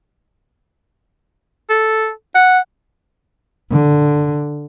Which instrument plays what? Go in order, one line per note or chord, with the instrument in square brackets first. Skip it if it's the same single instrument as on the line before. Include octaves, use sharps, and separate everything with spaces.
[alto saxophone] A4
F#5
[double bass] D3